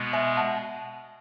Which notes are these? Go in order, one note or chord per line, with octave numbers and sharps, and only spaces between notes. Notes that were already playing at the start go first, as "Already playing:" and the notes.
Already playing: B2 G#3 B3
E5 G#5
F#5 A5